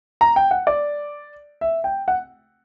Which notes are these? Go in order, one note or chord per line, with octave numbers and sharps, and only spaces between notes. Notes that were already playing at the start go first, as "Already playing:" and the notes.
A#5
G5
F#5
D5
E5
G5
F#5